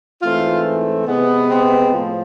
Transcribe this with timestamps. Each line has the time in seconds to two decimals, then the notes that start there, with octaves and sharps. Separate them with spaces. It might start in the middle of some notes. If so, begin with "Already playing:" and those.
0.22 G#2 E3 A3 C4 F4
1.06 C3 G#3 B3
1.48 C4
1.90 A2 F3 A3